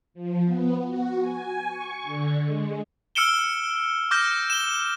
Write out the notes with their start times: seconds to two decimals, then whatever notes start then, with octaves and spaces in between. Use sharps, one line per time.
0.14 F3
0.45 B3
0.86 F#4
1.21 G#5
1.66 C#6
2.03 D3
2.46 G#3
3.15 E6 F6 C#7 D7 E7 G7
4.11 D6 F6 G6 A#6
4.50 E7 G7